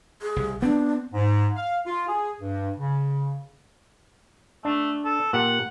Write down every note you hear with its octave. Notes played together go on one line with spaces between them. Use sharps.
G#4
C2
B3 C4 D4
G#2
F5
F4
G#4
G2
C#3
A3 D4
A4
A#2 G4 F#5